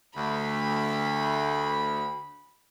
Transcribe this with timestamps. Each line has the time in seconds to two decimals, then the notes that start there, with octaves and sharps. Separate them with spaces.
0.16 D2 B5